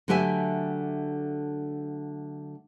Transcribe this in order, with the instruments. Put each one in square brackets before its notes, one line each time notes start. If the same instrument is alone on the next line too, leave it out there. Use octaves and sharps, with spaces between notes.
[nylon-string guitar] D3 F#3 A3 G4 E5 G#5